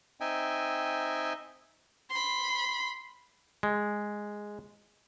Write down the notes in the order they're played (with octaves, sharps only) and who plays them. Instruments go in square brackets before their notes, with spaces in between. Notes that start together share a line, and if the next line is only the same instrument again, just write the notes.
[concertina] C4 D#4 D#5 E5 G5 G#5
[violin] B5 C6
[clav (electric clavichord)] G#3